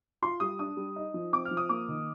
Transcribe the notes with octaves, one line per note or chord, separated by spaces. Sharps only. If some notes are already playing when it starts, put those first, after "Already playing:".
F4 C6
G3 D#6
D4 D#6
G3
D#4
F3
C4 D6
F6
F3
D#6
A#3 D6
D#3